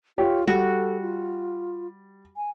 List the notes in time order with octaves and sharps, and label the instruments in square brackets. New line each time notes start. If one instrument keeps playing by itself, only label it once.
[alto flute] F4 [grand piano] G4 C#5 G5
[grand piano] G3 [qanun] F#4 [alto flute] A4
[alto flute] F4
G#5